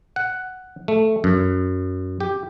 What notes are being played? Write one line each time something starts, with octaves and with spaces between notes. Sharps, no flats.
F#5
A3
F#2
G4